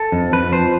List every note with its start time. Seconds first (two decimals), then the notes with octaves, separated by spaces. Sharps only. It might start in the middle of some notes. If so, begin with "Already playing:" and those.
Already playing: A4
0.12 F2
0.33 F2 B4
0.52 F3 C5